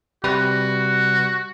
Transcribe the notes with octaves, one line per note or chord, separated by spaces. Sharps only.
C3 G3 F#4 B4